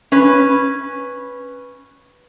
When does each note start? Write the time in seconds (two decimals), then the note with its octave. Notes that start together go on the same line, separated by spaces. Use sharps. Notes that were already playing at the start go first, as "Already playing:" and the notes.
0.12 C#4 B4